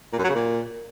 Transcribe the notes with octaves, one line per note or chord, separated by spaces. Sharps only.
A#2
F#2
F#3
C#3
A#2